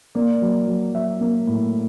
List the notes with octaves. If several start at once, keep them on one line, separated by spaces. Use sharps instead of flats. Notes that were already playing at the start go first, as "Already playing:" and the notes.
A#3 D5
F#3
F#3
F#3 E5
A#3
A2